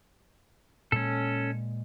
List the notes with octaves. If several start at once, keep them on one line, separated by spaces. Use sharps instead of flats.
A#2 G#3 C#4 A4